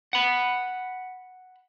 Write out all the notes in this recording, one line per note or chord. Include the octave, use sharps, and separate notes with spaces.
F#5 B5